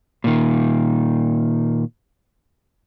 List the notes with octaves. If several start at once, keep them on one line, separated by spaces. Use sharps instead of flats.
A#2 D#3